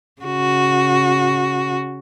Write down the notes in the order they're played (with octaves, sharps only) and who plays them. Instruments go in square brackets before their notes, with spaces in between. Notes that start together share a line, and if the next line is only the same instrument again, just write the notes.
[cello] C#3 F#4